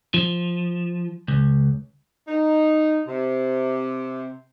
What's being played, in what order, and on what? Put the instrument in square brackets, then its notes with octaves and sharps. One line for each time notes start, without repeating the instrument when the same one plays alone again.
[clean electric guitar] F3
C#2
[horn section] D#4
C3